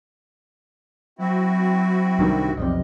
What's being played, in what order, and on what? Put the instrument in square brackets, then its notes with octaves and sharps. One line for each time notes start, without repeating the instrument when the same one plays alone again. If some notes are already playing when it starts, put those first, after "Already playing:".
[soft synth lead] F#3 [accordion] C4 E4 F#4
[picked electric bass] C2 G2 D#3
[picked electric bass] B1 F2 C3 [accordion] G3 [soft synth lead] D#5